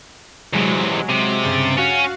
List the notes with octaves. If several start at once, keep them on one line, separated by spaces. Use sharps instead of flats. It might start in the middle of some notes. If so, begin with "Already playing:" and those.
E2 C3 F#3 G#3
C3
G2 C#3 A6
C#4 F#4 F5